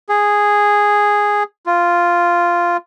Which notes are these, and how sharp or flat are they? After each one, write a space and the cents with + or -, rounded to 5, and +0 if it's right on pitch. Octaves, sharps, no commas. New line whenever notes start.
G#4 -5
F4 -5